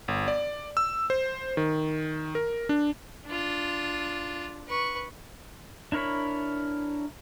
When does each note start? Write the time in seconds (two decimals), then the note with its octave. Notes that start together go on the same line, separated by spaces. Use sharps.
0.08 G1
0.28 D5
0.77 E6
1.10 C5
1.57 D#3
2.35 A#4
2.69 D4
3.27 D4 F4
4.68 B4 C#6
5.92 D4 E4 A#4 C#5 B5